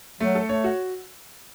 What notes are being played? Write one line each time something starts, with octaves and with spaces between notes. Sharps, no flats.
F#3 A3
A4
A3 C#5
F#4